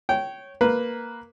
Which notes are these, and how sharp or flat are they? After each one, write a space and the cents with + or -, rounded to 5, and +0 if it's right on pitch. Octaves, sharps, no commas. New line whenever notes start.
C#5 -5 G5 -25
A#3 +0 B4 +0